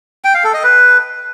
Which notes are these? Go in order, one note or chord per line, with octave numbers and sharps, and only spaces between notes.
G5
F5
A4
D#5
B4